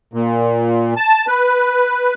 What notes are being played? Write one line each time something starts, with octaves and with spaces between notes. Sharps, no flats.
A#2
A5
B4